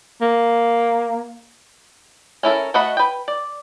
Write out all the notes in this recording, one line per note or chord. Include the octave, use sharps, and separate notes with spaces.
A#3
C#4 E4 A4 A#4
A3 F#4 D#5 F#5 B5
B4 G5
D5